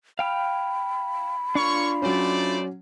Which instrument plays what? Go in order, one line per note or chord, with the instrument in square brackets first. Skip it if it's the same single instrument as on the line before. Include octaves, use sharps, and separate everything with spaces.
[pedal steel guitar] F5 G5 F6 [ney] B5
[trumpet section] A#3 C#5 C#6 [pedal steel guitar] D4 F4
[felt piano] F#3 C#4 [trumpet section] A3 C5 D5